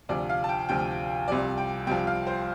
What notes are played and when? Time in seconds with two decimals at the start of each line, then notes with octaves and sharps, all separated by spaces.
0.09 D2 C3 F3 D5
0.29 F5
0.44 A5
0.49 G5
0.69 D2 C3 F3 G5
1.28 C2 C3 F3 D5
1.58 G5
1.87 C2 C3 F3 G5
2.07 F5
2.27 C5